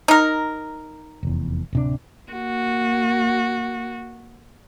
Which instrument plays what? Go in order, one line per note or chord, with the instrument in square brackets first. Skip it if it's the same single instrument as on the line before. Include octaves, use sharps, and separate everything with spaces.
[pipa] D#4 A#4
[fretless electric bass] F1 E2
D1 C3 D4
[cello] A#3 F#4